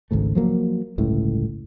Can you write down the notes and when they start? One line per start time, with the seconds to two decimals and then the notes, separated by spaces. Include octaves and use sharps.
0.11 G#1 C#2 G#2 A3
0.35 F3 F#3 A#3
0.98 G1 C#2 A2